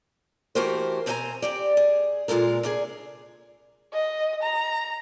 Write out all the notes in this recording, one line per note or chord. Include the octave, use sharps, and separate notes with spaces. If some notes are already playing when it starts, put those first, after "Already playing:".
E3 A3 F#4 G4 A#4 C5
B2 C4 C5 D#5 G#5 A#5
C4 G4 D5
G#4
A#2 G#3 F4 A4 A#4
C3 D4 G#4
D#5
A#5